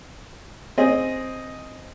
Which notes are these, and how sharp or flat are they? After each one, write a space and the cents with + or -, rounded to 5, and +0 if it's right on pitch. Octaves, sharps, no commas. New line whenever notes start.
C4 +0 G#4 +0 D#5 +0